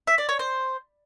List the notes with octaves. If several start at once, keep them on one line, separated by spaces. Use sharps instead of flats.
E5
D5
C#5
C5